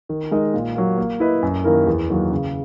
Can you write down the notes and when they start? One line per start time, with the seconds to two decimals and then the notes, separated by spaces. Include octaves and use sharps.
0.09 D#3
0.31 G#3 D#4 A#4 D#5
0.54 A#2
0.76 F#3 A#3
0.98 A#3
1.20 E4 B4 D#5
1.43 F#2
1.64 D#3 A#3 E4 A#4
1.87 E2
2.09 D#3 F#3 A#3
2.32 C#3